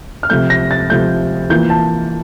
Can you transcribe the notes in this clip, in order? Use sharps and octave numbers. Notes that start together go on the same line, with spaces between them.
F6
C3 F3 A3 G6
A#6
A6
C3 F3 A3 G6
E3 A#3 F4 G6
A5